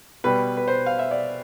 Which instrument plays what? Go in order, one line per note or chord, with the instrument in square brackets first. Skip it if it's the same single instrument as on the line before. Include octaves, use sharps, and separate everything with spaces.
[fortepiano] B2 G3 B4
B4
C5
F5
E5
D5